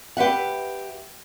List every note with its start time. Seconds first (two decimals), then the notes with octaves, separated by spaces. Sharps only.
0.17 G4 B4 E5 F#5